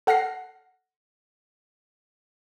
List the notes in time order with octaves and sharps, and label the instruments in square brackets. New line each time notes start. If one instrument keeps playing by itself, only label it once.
[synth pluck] A4 F#5 F6 A#6 C7